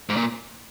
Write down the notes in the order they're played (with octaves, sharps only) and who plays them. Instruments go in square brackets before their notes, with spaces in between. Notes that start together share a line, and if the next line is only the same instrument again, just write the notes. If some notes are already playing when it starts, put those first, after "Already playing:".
[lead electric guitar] G#2
A#2